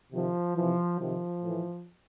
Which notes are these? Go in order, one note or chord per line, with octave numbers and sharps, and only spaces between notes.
C3 D#3 F3
C3 E3 F3
C3 D#3 F3
A2 E3